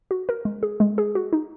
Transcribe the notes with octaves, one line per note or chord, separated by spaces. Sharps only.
F#4
A#4
G#3
G#4
G#3
G#4
F#4
D#4